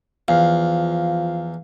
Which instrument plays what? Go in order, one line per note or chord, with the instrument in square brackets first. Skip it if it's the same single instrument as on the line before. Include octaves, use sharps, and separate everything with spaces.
[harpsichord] E2 [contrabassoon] F3 [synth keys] F5